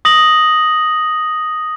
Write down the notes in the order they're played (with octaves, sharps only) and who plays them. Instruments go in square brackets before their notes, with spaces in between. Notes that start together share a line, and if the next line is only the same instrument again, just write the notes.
[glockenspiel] D#6 A#6 F#7